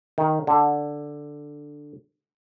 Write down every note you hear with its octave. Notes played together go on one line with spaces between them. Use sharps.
D#3
D3